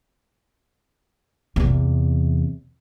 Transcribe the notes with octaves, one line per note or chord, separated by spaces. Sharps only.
E2 C3